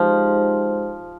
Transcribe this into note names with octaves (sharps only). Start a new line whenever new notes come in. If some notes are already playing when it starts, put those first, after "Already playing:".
Already playing: F3 G#3 D#4 G4 C5